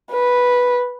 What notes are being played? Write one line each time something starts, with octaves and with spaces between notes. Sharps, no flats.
B4